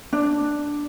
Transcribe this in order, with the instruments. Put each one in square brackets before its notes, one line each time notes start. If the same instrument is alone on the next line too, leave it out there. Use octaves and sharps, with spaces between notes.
[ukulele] D4